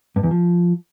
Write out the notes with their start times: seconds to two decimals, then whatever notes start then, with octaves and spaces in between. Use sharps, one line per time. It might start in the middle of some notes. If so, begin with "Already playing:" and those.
0.16 G2
0.23 E2
0.31 F3